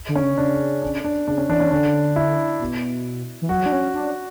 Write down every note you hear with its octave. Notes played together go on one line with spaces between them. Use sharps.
D3
C#4
C#3
C#3 D4
D4
D4
C#3 D4
C#4
E3 D4
C#4
D3 D4
E4
B2
E3
F#3 F#4
D4
C#4
D4